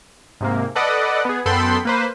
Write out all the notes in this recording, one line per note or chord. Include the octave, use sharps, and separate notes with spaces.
G#2 C3 A#3
A4 B4 D5 D#5 F#5
B3 G#4
F#2 B3 A4 G5 B5 C6
A#3 B4 C5